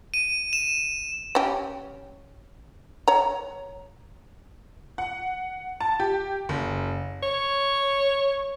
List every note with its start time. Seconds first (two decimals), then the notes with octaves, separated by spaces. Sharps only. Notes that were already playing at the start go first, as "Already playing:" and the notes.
0.14 D#7
0.53 E7
1.35 C#4 G4
3.08 C#5 A#5
4.98 F#5
5.80 A5
6.00 G4
6.49 F#1
7.23 C#5